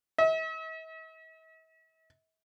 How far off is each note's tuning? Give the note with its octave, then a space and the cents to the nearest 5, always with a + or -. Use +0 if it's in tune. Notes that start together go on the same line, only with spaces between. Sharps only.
E5 -45